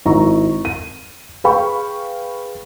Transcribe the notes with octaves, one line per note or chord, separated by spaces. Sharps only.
G#1 E4 A#5 C#6
D#7
G#4 B4 F5 G5 B5 C#6